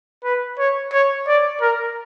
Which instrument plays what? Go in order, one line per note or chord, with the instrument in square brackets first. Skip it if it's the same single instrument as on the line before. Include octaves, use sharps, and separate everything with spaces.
[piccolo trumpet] B4
C#5
C#5
D5
A#4